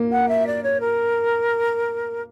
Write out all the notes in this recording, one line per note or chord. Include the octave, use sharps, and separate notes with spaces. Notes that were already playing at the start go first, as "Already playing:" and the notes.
Already playing: A#3
F#5
E5
D5
C#5
A#4